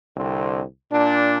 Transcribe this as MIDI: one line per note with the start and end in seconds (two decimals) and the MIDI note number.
0.16 0.63 36
0.16 0.63 50
0.16 0.63 60
0.91 1.38 46
0.91 1.38 62